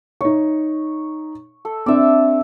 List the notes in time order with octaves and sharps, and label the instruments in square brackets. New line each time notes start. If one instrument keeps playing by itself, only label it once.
[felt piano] D#4 C#5 [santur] C#6
[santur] A4
[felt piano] C4 D4 [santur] D5 E5